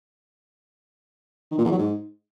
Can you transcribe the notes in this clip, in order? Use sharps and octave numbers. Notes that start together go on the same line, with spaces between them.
D#3
A#2
E2
F#3
G#2